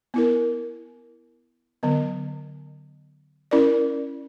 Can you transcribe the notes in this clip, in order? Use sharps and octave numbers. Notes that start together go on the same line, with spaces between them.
B3 E4 A#4
D3 F#3 B3
C#4 E4 A#4 D5